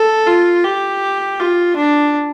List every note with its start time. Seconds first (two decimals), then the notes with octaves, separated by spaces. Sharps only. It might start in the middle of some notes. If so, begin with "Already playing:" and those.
Already playing: A4
0.27 F4
0.64 G4
1.40 F4
1.76 D4